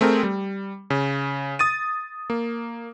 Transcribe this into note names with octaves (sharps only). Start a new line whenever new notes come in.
A3 C4 G#4 A#4
G3
C#3
D#6 A6 D#7
A#3